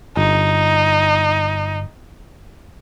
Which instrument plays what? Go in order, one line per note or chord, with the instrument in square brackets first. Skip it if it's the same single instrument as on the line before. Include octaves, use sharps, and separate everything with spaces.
[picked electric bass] G1 [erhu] D#4